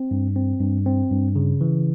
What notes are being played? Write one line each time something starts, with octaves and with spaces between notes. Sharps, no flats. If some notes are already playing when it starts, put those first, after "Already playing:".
Already playing: C4
G2
C4
G2
C4
G2
C#3
E3